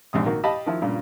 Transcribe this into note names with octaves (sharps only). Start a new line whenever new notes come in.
A#1 G#2 C3 D#6
D#3 A#3 F#4
G4 D#5 F5 A5 B5
D#3 F3 E4
G2 A#2 C#3